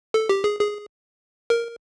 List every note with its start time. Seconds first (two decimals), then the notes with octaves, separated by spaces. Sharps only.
0.14 A4
0.29 G4
0.44 G#4
0.60 G#4
1.50 A#4